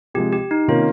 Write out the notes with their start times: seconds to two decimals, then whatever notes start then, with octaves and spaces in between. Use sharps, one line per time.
0.14 C3 F3 G#3 G4
0.33 G4
0.51 D#4
0.68 C3 D#3 A#3 C#4 F4